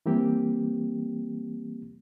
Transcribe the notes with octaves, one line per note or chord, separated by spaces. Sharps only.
E3 G3 A#3 C4 G4